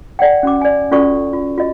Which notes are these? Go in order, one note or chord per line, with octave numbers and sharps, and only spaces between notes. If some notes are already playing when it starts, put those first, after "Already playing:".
D5 F#5 G5
C#4 F#4 D6
D5 G#5
C#4 F4 F#4 A4 D5 C#6
F4
F4 F#4 D#5